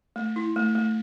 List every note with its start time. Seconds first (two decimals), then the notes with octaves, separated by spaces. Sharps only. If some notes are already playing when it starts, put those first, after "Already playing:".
0.16 A3
0.36 E4
0.56 A3
0.75 A3